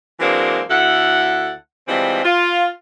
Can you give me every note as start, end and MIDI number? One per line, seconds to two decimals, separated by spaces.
0.20 0.61 52
0.20 0.61 54
0.20 0.61 56
0.20 0.61 58
0.20 0.61 60
0.20 0.61 62
0.69 1.52 38
0.69 1.52 64
0.69 1.52 69
0.69 1.52 78
1.87 2.21 52
1.87 2.21 53
1.87 2.21 55
1.87 2.21 56
1.87 2.21 60
2.24 2.67 65